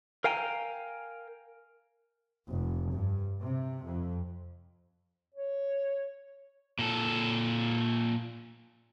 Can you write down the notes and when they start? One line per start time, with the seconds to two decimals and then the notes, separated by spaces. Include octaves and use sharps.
0.24 A#4 F5 G5 G#5 A#5
2.48 F1
2.93 G2
3.42 C3
3.85 F2
5.35 C#5
6.79 A#2 A4